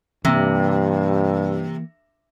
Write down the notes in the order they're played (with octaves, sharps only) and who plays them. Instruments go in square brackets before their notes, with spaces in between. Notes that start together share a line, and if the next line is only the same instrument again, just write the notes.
[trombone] G2 [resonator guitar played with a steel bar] C3 [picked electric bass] E3 A#3